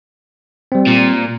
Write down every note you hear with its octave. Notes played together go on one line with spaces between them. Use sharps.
G3 C4
A#2